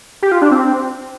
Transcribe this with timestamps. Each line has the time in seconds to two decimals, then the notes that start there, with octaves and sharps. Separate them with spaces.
0.22 G4
0.32 F4
0.42 D4
0.51 C4